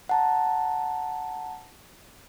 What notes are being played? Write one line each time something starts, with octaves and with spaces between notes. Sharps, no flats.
F#5 A5 A#5